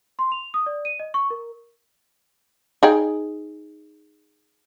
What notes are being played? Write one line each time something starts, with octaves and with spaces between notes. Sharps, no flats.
C6
F7
D#6
D5
D#7
D#5
C#6
A#4
D#4 G#4 G5